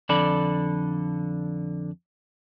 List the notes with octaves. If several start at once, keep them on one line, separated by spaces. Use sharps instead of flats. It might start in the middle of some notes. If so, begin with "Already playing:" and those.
F2 D3 A4 D5 B5